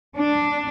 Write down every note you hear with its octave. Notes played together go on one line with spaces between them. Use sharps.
D4